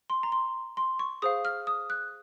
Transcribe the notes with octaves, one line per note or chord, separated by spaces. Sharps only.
C6
A#5
C6
C6
C#6
G#4 C5 F5 D#6
F6
D#6
F#6